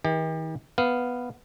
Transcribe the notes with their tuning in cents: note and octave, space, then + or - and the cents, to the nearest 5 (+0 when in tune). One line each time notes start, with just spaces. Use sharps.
D#3 +45 G4 +35
B3 +0 F5 +0